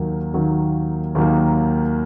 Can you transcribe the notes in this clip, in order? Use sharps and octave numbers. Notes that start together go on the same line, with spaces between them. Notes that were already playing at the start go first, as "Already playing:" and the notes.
Already playing: D#2 D#3 F#3 A#3
D#2 D#3 F#3 A#3
D#2 D#3 F#3 A#3